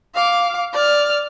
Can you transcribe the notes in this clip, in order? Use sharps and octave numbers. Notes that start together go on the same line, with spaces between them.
F5 D6
D5 F6